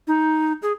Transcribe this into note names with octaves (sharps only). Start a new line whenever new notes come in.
D#4
G#4